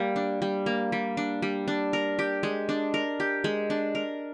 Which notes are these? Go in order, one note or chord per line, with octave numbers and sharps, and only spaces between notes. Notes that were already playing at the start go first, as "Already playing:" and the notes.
Already playing: G3 A#3
D4
G3
A#3
G3
D4
G3
D4
A#4
G4
G#3
D4
A#4
G4
G#3
D4
A#4